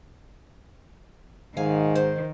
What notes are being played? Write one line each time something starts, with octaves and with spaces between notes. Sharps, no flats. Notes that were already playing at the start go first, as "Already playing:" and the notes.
G#2 D#3 F5 G#5
C5